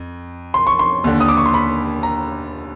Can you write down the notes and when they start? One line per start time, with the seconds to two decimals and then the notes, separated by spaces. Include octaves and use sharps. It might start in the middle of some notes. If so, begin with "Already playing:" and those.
Already playing: F2
0.54 C6
0.67 C#6
0.79 C6
1.04 D#2 D3
1.20 D#6
1.28 D6
1.37 C#6
1.46 C6
1.54 B5
2.03 A#5